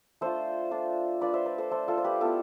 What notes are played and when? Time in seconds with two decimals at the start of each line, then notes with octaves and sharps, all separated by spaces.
0.21 A3 D4 F4 A4 C5
0.71 A3 D4 F4
1.21 A3 D4 F4 B4 D5
1.34 C5 E5
1.46 B4 D5
1.58 A4 C5
1.71 A3 D4 F4 A4 C5
1.88 F4 A4
1.98 C5
2.04 G4 B4
2.21 B3 E4 F4 A4